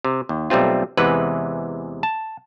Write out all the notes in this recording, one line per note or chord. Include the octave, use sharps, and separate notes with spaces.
C3
D#2
B1 G3 A3 C4 F4
E2 C3 E3 G#3 B4 F#5
A5